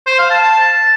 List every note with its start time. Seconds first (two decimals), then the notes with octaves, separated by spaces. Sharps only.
0.06 C5
0.18 F5
0.30 A5
0.42 A5